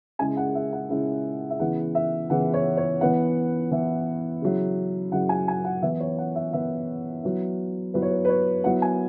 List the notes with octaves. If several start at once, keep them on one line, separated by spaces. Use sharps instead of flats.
C#3 G#3 C#4 E4 G#5
F#5
E5
F#5
C#3 G#3 C#4 E4
E5
C#3 E3 B3 E4 F#5
E5
C#3 E3 B3 E4 F#5
C#5
C#5
E3 B3 E4 F#5
E3 B3 E4
C#3 F#3 E4
C#3 F#3 E4 F#5
G#5
G#5
F#5
E3 B3 E4 E5
C#5
F#5
E5
E3 B3 E4 E5
F#3 B3 E4
F#3 B3 E4 B4
C#5
B4
B4
C#5
F#3 B3 E4 F#5
G#5